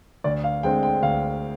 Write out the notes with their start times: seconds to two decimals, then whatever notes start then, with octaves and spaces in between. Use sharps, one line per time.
0.24 D2 D5
0.44 F5
0.63 D3 G#3 C4 G5
0.83 G5
1.02 D2 F5